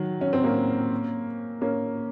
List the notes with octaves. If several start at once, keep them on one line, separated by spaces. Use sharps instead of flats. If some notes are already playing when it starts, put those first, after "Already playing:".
Already playing: D#3 F#3
C#4
C4
A#3 C#4
A#3 C#4